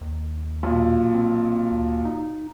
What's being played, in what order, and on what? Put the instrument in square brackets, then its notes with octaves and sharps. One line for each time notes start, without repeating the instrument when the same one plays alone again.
[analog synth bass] D#2
[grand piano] B1 A#2
[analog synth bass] C4
D2
D#4